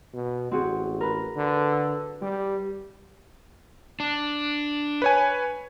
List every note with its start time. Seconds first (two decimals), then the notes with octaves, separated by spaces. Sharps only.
0.14 B2
0.52 A1 C4 F#4 G#4
1.01 A#4 B4
1.36 D3
1.72 E6
2.22 G3 G4
4.00 D4
5.02 B4 C#5 G#5